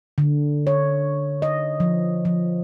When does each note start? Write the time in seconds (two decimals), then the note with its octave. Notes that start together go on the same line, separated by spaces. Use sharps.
0.18 D3
0.67 C#5
1.42 D#5
1.80 F3
2.25 F3